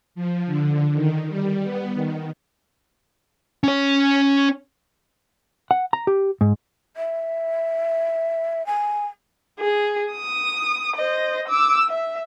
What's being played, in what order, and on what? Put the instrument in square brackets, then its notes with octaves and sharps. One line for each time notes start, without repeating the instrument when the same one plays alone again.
[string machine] F3
D3
D#3
G3
B3
D#3
[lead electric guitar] C#4 C#5
[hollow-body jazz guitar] F#5
A#5
G4
G#2
[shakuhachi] E5
G#5
[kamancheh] G#4
D#6
C5 D#5
D6 E6
E5